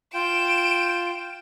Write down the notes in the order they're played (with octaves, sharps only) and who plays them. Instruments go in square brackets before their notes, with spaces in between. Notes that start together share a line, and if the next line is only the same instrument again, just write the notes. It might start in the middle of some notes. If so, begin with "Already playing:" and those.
[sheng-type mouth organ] F4 G5 [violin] D7 E7